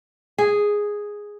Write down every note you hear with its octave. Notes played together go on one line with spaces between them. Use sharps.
G#4